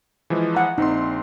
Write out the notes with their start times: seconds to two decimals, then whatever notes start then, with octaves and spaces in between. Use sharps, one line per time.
0.30 E3 F3 G#3
0.54 F#5 A#5
0.78 A#1 C4 D#4 C6